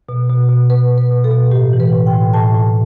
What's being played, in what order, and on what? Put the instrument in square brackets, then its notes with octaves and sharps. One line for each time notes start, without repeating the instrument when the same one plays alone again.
[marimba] B2
B2
B2
B2 B4
B2
B4
B2
A4
B2
A2 G4
E3
B4
A2
G5
A2
A2 A5
A2